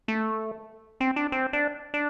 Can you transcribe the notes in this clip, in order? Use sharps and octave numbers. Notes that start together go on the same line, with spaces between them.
A3
C4
D4
C4
D4
D4